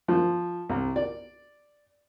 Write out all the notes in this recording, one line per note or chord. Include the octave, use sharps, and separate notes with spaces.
F3
C2
D5